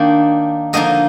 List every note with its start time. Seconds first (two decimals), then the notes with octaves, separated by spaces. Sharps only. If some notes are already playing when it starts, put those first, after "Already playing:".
Already playing: D#3 A#3 D4 G5
0.73 D3 F3 A#3 D#4 D#5